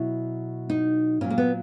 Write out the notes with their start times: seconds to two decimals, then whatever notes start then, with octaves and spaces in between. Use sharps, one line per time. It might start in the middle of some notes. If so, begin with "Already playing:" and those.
Already playing: B2 F#3 E4
0.70 D#4
1.21 A#2 F#3 C#4
1.30 A#3
1.38 B3